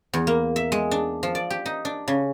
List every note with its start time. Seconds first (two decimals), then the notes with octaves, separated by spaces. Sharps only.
0.13 E2
0.27 A#3
0.56 E5
0.72 G#3
0.91 D4
1.23 F3
1.35 D5
1.50 G4
1.66 D#4
1.85 D4
2.08 C#3